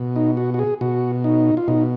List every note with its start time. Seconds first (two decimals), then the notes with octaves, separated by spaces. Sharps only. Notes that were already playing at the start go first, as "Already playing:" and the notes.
Already playing: B2
0.16 D#4
0.37 F#4
0.54 F#4
0.59 G#4
0.81 B2 F#4
1.24 D#4
1.57 F4
1.68 B2 D#4